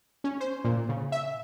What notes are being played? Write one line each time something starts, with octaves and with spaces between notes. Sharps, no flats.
C#4
C5
A#2
C#3
E5